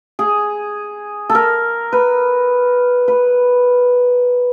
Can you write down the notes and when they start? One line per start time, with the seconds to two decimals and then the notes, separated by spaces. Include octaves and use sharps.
0.19 G#4
1.30 A4
1.35 A#4
1.92 B4
3.08 B4